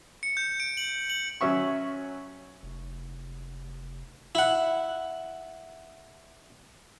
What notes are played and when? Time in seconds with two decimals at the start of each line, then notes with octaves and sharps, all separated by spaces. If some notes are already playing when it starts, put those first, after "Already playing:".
0.23 C#7
0.37 G6
0.60 D7
0.77 F#7
1.10 F#7
1.41 F#3 C#4 E5 C#6
2.63 F1
4.35 E4 F#5